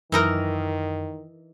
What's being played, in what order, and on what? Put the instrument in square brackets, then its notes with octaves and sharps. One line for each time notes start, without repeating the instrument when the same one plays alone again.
[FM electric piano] F#2 [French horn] D#3 [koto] E3 D#4 A#4